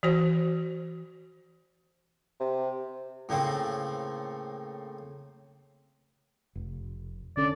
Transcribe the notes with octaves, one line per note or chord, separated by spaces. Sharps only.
E3 F#4 C5
C3
A2 C#3 A#3 C4
F1
D3 C#4 A4 D5